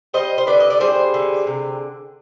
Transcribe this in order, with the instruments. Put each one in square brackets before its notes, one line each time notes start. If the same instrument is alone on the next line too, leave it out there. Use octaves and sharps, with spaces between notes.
[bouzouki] G3 C5 D#5
C5
D3 B4 D5
D#5
D5
G3 G#4 C5
D3
C3